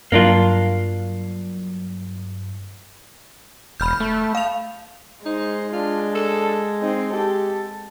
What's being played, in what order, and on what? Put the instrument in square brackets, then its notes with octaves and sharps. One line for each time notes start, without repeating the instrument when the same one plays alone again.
[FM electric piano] G2 F#3 [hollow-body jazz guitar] A#3 D4 F4
[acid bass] E1 [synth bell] B5 F6 G6
[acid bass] A3
[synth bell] F5 F7
[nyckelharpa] G#3 [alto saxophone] D#4 [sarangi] C5
[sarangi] D4 [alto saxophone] F4
[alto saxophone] A4
[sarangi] C4 [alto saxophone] D#4
[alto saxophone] G4 [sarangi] A4